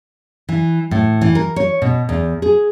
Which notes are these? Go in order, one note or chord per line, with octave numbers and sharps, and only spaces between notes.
E3
A2
E3
A#4
C#5
B2
E2
G#4